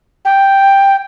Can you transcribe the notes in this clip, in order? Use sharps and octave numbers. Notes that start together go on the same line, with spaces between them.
G5